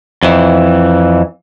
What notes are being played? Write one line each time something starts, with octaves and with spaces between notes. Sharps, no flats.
F2 E3